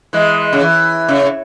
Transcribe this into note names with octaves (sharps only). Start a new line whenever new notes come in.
E3 G#3
C#3
E3
C#3